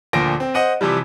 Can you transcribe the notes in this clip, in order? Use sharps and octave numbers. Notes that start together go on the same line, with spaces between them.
D2 A#2 F3 A#6 D7
C4
C5 D#5 F#5 D#7
C3 E3 F3 G3